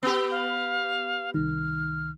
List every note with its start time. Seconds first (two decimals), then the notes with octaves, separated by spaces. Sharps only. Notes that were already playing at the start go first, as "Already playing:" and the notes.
0.03 B3 G4 E6
0.31 F5
1.34 C2 D#3 F6